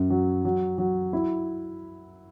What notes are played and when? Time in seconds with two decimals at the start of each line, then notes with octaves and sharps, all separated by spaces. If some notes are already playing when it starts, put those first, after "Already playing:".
Already playing: F#2
0.10 F#3
0.45 F#3
0.78 F#3
1.13 E4